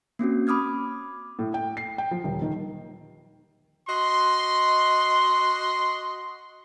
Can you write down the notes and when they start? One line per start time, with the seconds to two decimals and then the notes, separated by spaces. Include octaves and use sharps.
0.19 A#3 C4 C#4 F#4
0.47 B5 D6 D#6 F6 G#6
1.39 A2
1.54 G5
1.77 C7
1.98 G5
2.11 F3
2.24 D#1
2.42 D#3
3.88 F#4 D#5 C6